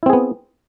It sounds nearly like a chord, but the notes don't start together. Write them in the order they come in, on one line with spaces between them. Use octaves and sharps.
E4 C4 G#4 B3